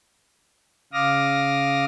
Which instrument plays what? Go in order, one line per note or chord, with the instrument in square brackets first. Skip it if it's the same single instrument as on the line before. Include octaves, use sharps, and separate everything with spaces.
[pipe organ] C#3 F5 D6 D#6 F6 A#6